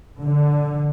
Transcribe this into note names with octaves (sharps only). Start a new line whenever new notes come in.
D3